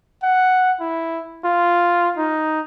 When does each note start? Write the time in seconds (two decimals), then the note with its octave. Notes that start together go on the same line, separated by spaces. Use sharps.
0.23 F#5
0.80 E4
1.44 F4
2.17 D#4